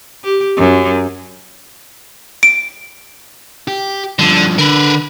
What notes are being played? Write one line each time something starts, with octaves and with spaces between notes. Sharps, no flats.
G4
F#2
D7
G4
G2 D3 F3
D3 A#4 B4